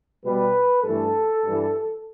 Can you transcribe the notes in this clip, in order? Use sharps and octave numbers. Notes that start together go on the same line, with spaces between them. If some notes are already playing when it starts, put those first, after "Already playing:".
B2 G3 B4
G2 E3 A3 A4
G2 E3 G3